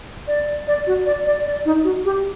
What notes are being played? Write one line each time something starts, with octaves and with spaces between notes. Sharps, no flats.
D5
D5
F#4
D5
D5
D5
D#4
F#4
G4